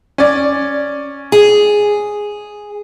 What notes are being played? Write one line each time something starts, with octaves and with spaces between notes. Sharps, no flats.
C#4 D5
G#4